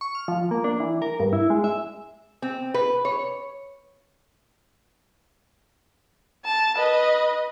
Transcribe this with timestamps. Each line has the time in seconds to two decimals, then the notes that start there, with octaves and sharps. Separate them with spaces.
0.01 C#6
0.15 F6
0.28 F3
0.51 A#3
0.64 D4
0.80 E3
1.02 A#4
1.20 G2
1.33 E4
1.50 G#3
1.64 E5
2.42 C4
2.74 B4
3.05 C#5
6.45 A5
6.76 B4 D#5